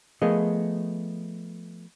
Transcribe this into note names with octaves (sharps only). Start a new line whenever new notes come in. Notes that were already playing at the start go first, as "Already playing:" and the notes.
F3 A3 B3 G#4 A#4 D#5